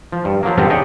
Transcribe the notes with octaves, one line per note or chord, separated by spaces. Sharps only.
F3
G2
F3 F#3 A#3
G2 A#2 D3 B3 C4 F4
D4 D#4 G4 G#4 C#5 D#5